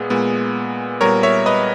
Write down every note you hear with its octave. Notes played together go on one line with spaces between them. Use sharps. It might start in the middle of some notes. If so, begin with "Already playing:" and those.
Already playing: A#2 G#3 B3 G#4
A#2 G#3 B3
A#2 G3 B3 A#4 C#5
C#5 E5
B4 D#5